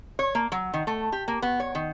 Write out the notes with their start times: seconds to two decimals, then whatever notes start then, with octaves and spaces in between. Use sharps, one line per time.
0.19 C#5
0.35 A#3
0.52 F#3
0.74 D#3
0.87 A3
1.12 G4
1.28 A#3
1.42 B3
1.60 C#5
1.75 D#3